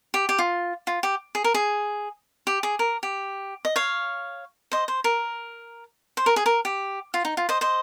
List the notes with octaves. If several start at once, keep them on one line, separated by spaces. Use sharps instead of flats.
G4
G4
F4
F4
G4
G#4
A#4
G#4
G4
G#4
A#4
G4
D#5
C#5 F5
C5 D#5
C5
A#4
C5
A#4
G#4
A#4
G4
F4
D#4
F4
C5 D#5
C5 D#5